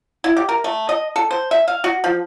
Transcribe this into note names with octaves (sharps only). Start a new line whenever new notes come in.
E4
G4
A#4
A3
D#5
A4
C5
E5
F5
F#4
F3